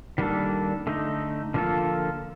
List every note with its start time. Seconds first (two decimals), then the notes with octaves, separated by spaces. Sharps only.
0.18 D#3 G3 A#3 D4 A4
0.87 D3 A3 D#4
1.54 D3 F3 A#3 F4 A4